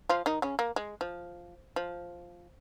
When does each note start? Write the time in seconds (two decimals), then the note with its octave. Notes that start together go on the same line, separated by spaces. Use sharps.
0.09 F3 F4
0.26 D#3 D#4
0.42 C#3 C#4
0.59 A#3
0.76 G#3
1.01 F3
1.76 F3